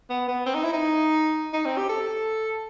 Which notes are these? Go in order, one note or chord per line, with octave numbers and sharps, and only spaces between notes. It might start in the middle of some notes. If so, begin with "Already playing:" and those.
B3
B3
C4
D#4
E4
D#4
D#4
C4
G4
A4